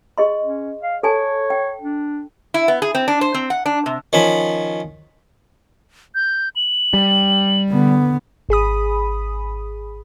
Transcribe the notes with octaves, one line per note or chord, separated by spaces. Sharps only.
G#4 D#5 C6
C#4
F5
A4 C#5 G#5 A5
G5
D4
E4
B3
G#4
C4
D4
C5
C4
F#5
D4
C3
D#3 F3 C#4 B5
G6
F#7
G3
D3 B3
G#1 G#4 B5 D#6